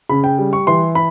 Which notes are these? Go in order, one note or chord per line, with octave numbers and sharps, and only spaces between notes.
C#3 B5
G5
G3
C#6
E3 C6
B5